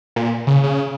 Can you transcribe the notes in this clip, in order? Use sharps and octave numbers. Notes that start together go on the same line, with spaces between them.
A#2
C#3
C#3